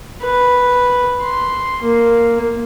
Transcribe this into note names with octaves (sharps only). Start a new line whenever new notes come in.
B4
C6
A#3